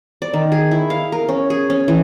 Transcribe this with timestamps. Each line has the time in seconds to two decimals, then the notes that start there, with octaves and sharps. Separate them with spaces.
0.22 D5
0.34 D#3
0.52 G#4
0.71 E4
0.90 F5
1.12 A#4
1.29 C#4
1.50 G#4
1.70 C#4
1.88 E3